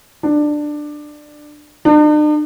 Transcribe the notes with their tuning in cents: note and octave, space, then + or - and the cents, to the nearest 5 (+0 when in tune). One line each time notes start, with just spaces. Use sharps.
D4 +15
D4 +45